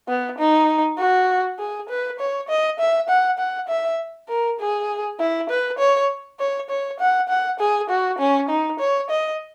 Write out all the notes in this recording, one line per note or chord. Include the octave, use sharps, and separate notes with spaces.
B3
D#4
F#4
G#4
B4
C#5
D#5
E5
F#5
F#5
E5
A#4
G#4
E4
B4
C#5
C#5
C#5
F#5
F#5
G#4
F#4
C#4
D#4
C#5
D#5